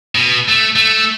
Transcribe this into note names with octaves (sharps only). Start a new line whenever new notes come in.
B2
A3
A3